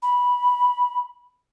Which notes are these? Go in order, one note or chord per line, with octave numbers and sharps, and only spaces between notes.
B5